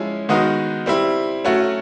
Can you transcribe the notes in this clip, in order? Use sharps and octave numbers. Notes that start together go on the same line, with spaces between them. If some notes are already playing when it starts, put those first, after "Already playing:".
Already playing: F3 G#3 C#4 E4
D#3 G#3 B3 D#4 F#4
G3 C4 E4
F#3 A3 C#4 F#4